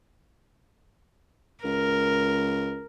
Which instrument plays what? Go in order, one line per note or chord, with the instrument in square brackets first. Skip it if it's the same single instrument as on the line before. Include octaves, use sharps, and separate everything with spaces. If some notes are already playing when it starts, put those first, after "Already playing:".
[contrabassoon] C#2 [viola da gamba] A#4